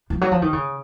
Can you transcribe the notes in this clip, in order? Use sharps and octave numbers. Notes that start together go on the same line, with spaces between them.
F3
F#3
F3
D#3
C#3